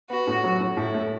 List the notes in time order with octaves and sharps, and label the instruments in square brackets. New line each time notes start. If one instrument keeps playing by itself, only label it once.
[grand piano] B3 [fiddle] F#4
[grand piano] A2
F#3
A2
[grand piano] A2 [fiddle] E4
[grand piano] A3